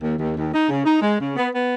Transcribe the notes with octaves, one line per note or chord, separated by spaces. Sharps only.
D#2
D#2
D#2
D#4
C#3
D#4
G#3
C#3
B3
B3